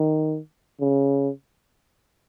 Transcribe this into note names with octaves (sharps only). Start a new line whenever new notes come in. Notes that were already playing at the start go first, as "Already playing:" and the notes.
Already playing: D#3
C#3